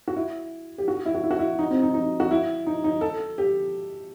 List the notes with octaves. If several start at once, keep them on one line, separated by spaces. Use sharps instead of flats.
F#4
E4
G4
F#4
E4
F#4
E4
F#4
E4
D#4
C4
D#4
D#4
F#4
E4
D#4
D#4
A4
G4